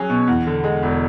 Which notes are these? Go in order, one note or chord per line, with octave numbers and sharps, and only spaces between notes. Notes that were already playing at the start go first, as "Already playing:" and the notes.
Already playing: F#3 C#4 G#4
B2
E2
D3
G#3
E1